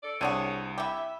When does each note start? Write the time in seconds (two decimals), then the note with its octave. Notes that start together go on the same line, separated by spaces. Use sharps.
0.02 A4 D5
0.21 C2 C4 D4 F#4 G#4 C#5 D#7
0.78 E4 G4 E5